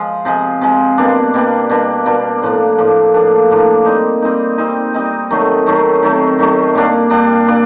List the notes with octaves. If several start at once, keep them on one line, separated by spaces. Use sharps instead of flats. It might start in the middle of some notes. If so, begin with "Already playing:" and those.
Already playing: F3 G#3
C3 F3 G#3
C3 F3 G#3
B2 G3 A#3 D4
B2 G3 A#3 D4
B2 G3 A#3 D4
B2 G3 A#3 D4
A2 F3 A#3 D4
A2 F3 A#3 D4
A2 F3 A#3 D4
A2 F3 A#3 D4
G3 C4 D#4
G3 C4 D#4
G3 C4 D#4
G3 C4 D#4
C3 D#3 F#3 A3
C3 D#3 F#3 A3
C3 D#3 F#3 A3
C3 D#3 F#3 A3
A#2 G3 A#3 D4
A#2 G3 A#3 D4
A#2 G3 A#3 D4